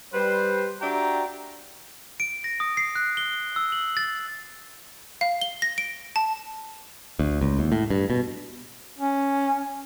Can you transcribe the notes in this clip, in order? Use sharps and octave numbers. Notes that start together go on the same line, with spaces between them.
G3 B4 C5
D4 F#4 G4 E5 G5 A#5
D7
A#6
D#6
C7
F#6
G7
E6
F#7
A6
F5
G7
A#6
D7
A5
D2
C#2
D#2
A2
G2
B2
C#4